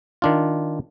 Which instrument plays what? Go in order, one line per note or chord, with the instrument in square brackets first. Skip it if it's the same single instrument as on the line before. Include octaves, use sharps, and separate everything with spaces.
[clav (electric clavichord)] D#3 D4 F4